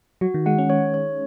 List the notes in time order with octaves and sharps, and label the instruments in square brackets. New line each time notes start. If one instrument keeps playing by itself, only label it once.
[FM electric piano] F#3 [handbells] F#4
[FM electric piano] D#3
[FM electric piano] G#3 [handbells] F#5
[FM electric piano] C#4
[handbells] C#5
C#5